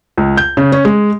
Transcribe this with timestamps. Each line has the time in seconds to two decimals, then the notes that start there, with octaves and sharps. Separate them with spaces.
0.18 C#2
0.37 G6
0.57 C#3
0.72 C#4
0.85 G#3